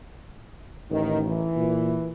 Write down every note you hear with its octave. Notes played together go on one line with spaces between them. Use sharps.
A1 D#3
E3
A#2